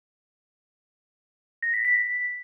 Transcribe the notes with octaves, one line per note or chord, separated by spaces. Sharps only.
A#6
B6
B6